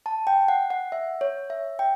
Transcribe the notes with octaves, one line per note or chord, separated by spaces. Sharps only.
A5
G5
F#5
F#5
E5
C#5
E5
G5